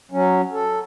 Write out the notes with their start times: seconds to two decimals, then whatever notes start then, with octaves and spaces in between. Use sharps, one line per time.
0.12 F#3 C#4
0.52 A4